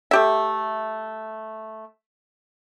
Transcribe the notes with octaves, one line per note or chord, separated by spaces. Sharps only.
A3 G4 E5